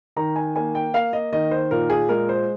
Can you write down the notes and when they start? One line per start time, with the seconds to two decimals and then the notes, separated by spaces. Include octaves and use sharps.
0.16 D#3 A#5
0.36 G#5
0.56 A#3 G#5
0.75 G5
0.94 A#3 F5
1.13 D#5
1.32 D#3 D#5
1.51 C5
1.71 A#2 A#4
1.90 G#4
2.09 G#3 A#4
2.29 C5